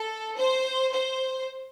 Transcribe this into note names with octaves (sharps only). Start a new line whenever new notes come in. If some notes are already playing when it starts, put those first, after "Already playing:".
Already playing: A4
C5
C5